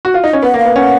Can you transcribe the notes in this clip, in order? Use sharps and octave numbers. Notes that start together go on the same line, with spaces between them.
F#4
F4
D#4
C#4
B3 F#5
A#3
F5
B3
C#4 F#5